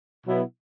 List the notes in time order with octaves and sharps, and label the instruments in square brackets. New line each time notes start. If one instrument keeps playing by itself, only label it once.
[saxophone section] B2 F#3 B3 E4